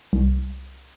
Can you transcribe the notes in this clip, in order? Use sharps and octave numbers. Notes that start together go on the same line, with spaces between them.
C2